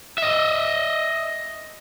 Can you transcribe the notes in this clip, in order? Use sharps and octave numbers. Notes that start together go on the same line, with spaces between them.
D#5 E5